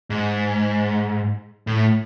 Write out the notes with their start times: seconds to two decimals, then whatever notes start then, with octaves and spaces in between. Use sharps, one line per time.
0.10 G#2
1.67 A2